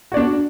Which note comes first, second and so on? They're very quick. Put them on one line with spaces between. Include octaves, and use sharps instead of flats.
F#4 D5 D4